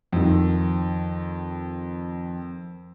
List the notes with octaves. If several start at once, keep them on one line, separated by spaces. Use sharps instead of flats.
F2 D#3